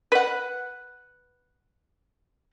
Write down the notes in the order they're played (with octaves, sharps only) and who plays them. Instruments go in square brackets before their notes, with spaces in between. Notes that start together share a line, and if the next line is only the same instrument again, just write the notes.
[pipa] B4 F#5